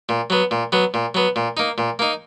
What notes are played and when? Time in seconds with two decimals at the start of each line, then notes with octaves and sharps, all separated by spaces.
0.09 A#2
0.30 F#3 B3
0.51 A#2
0.72 F#3 B3
0.94 A#2
1.15 F#3 B3
1.36 A#2
1.57 A#3 D#4
1.78 A#2
1.99 A#3 D#4